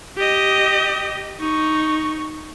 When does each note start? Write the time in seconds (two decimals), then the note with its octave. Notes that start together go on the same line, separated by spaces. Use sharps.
0.18 G4 D#5
1.40 D#4 C#6